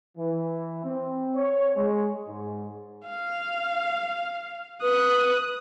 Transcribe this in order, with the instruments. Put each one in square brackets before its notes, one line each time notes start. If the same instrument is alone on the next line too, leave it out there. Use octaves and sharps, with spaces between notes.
[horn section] E3
C4
C#5
G#3
G#2
[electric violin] F5
[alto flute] B4 [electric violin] D#6 F#6